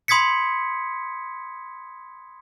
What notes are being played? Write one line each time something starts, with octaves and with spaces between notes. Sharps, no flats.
B5 C6 D#6 G#6 B6 C#7